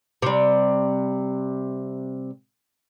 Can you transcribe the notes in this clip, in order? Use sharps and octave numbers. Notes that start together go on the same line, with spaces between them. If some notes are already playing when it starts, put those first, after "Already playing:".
C3 G3